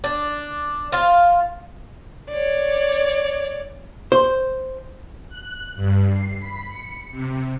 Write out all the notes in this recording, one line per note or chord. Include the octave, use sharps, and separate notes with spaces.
D4
F4 C5 F5
C#5 D5
C5
F#6
G2
C7
B5
C#7
C3